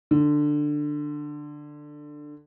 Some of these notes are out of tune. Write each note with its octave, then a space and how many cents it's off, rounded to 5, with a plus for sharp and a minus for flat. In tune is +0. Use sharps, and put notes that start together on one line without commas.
D3 +15